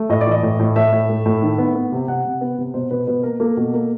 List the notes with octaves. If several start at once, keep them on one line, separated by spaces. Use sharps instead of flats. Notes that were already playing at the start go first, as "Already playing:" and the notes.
Already playing: A3
A2 D#5
D5
E3 D#5
A2
A2
A2 E5
A2
A3
A2
D#3
B3
B3
C3
C3 F#5
C3
B3
C3
B2 C5
B2 B4
B2 B4
A#3 A#4
A#3 A4
B2
A#3